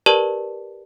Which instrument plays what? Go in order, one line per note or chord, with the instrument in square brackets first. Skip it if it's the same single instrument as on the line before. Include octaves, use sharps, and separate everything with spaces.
[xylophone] G4 A#4 B4 D5 A5